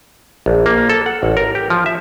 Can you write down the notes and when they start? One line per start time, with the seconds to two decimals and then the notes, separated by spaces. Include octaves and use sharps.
0.46 A#1
0.66 A#3
0.90 A4
1.06 F#5
1.23 A1
1.37 A#4
1.55 G4
1.70 F3
1.86 E5